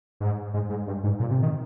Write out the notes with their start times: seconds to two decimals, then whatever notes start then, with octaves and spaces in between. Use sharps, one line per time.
0.20 G#2
0.54 G#2
0.70 G#2
0.87 G2
1.03 G#2
1.20 A#2
1.30 C3
1.42 D#3